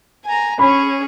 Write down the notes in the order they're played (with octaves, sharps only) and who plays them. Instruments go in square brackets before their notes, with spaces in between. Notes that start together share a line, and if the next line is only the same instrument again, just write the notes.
[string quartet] G#5 A#5
[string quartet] C#4 G#4 C#5 [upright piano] B5